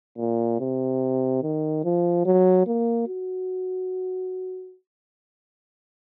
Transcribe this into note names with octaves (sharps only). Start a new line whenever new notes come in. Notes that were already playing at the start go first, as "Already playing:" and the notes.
A#2
C3
D#3
F3
F#3
A#3
F#4